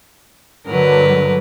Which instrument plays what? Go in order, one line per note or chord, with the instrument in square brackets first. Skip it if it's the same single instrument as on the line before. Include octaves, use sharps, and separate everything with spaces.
[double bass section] G2 D3 F#3 [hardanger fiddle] A#4 B4